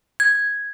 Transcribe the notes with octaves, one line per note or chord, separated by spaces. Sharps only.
G#6